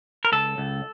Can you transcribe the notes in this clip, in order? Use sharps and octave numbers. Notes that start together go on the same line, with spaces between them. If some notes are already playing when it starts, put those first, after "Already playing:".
A#4
C#2 A4
C#2